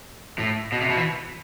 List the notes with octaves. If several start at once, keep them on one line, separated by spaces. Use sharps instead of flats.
A2
B2
C3
B2
E3